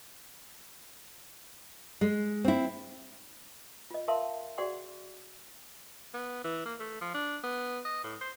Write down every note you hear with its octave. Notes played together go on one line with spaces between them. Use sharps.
G#3
C4 E4
F4 D#5
A#4 E5 F5 A5 C6
F#4 G#4 D5 F#5 C6
B3
E3
A#3
A3
F3
D4
B3
D#5
A2
C5